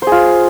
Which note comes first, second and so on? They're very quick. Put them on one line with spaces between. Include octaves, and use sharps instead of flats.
C5 G#4 F4